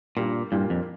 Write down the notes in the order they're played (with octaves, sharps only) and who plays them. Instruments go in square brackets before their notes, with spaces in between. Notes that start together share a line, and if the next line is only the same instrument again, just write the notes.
[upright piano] G2 G3 A#3 [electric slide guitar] A#2
[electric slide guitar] G2 [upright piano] A#2 G3 A#3 F4
[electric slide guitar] F2